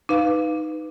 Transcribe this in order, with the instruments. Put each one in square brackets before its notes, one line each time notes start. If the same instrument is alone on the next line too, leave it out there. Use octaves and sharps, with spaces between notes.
[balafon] D#4 B4 F5